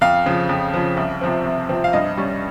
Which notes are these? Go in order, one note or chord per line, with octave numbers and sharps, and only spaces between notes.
F2 F5
C#3 F3
F2
C#3 F3
C2
C3 F3 C4
C2
C3 F3 C4
F5
G2 D#5
G3 C#4